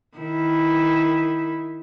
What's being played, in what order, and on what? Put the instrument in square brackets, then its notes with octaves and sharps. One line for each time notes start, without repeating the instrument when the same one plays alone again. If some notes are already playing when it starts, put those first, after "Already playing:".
[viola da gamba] D#3 E4